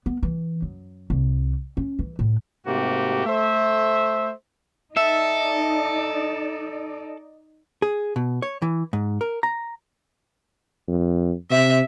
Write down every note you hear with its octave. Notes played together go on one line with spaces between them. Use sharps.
B3
E3
F#2
C2
C#4
E3
A2
G#2 C3 A3 A#3 F#4 G4
A3 C5 E5
D#4 A4 D5 E5
G#4
B2
C#5
E3
G#2
A#4
A#5
F2
C3 E5